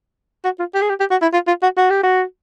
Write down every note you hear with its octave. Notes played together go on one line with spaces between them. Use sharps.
F#4
F4
G4
G#4
G4
G4
F#4
E4
F4
F4
F#4
F#4
G4
F#4